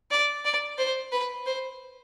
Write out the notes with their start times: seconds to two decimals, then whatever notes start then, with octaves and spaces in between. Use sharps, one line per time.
0.11 D5
0.45 D5
0.78 C5
1.12 B4
1.46 C5